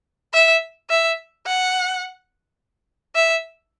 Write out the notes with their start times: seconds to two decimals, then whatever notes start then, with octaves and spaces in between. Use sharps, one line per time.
0.34 E5
0.90 E5
1.47 F#5
3.15 E5